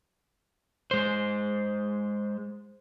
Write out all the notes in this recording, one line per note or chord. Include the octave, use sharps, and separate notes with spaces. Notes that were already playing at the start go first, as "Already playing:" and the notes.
G#3 C5